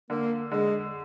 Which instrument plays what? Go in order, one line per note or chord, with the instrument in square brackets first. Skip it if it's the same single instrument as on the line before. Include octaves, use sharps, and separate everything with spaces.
[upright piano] D3 [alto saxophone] A#3
[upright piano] D3 [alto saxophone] G#3